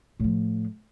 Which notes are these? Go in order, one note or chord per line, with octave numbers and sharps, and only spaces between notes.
A2 F3